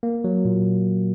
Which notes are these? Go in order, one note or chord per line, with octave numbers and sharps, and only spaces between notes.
A#3
F#3
A#2